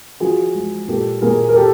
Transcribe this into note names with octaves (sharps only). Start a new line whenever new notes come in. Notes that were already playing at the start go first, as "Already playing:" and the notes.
F3 F#4 G#4
G#3
A#2 G4 A4
A#2 G#4 A#4
A#4
G4 A4